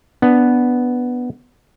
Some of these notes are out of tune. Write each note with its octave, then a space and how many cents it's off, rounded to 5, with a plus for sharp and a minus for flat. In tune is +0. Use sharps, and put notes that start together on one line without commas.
B3 +0 D4 +0